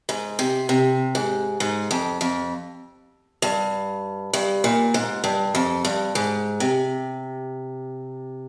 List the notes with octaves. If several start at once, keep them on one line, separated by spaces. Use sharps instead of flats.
G#2
C3
C3
G#2
G#2
F2
F2
G2
G2
A#2
G#2
G2
F2
G2
G#2
C3